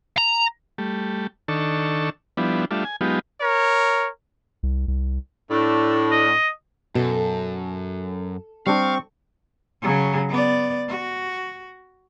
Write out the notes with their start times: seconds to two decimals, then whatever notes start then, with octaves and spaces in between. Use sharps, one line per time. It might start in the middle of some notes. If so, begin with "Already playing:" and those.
0.18 A#5
0.78 G3 A3
1.48 D#3 D4 A4 C#6 E6
2.37 F3 G3 B3 D4 E4
2.71 G3 A3 D4 F4 E5
2.85 G#5
3.01 F#3 G#3 B3 D#4 F4 G4
3.41 A#4 C#5
4.63 C2
4.88 C2
5.51 A2 A3 D4
6.11 D#5
6.95 F#2 B2 A4
8.67 G3 C4 D4 G4 F5 C#6
9.82 C#3 F#3
10.29 B3 D5
10.89 F#4